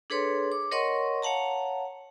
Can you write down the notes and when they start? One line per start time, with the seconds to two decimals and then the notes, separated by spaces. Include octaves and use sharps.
0.10 D4 G#4 A4 B4 C#5 C6
0.52 D6
0.71 A#4 C#5 D#5 F#5 C6 C#6
1.22 C#5 F5 F#5 A5 A#5